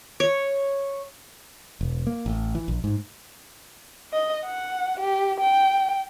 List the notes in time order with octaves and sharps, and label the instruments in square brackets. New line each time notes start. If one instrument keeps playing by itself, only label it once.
[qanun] C#5
[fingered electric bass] E1
A#3
A1
E3
A#1
G#2
[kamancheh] D#5
F#5
G4
G5